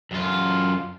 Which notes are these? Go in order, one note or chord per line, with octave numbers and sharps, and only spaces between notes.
F#2 F4